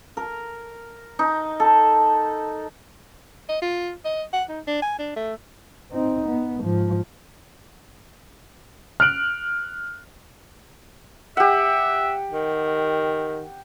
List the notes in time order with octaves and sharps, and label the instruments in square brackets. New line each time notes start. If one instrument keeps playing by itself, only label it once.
[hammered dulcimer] A#4
D#4
A4
[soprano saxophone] D#5
F4
D#5
F#5
D#4
D4
G#5
D4
A3
[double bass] C4 D#4
B3
G#2 F3
[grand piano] F6 F#6 D7 F#7
[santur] G4 F#5 [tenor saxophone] E5
[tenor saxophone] D#3